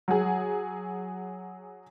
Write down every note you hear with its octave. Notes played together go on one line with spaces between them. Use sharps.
F#3 G#4